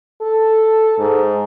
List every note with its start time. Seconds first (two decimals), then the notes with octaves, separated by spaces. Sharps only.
0.21 A4
0.99 G#2